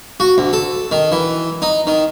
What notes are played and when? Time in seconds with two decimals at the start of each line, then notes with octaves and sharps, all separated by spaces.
0.20 F#4
0.38 D2
0.53 A4
0.92 D#3
1.12 E3
1.62 D#4
1.87 D#3